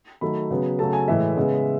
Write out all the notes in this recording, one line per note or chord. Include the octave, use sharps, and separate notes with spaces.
D#3 F#3 A3 B5
C#3 F#3 B3
C#3 F#3 A3 A5
G#5
A2 E3 G#3 E5
C#3 G#3 B3